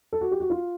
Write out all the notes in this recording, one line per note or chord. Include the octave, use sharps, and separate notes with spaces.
A4
F#4
G4
F#4
F4